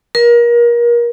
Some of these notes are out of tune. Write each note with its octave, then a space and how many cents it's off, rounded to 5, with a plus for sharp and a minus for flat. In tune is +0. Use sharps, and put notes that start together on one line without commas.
A#4 +30